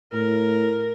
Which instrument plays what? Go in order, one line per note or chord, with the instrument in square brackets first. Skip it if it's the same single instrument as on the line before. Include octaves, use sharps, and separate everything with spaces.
[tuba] A2 [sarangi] A#4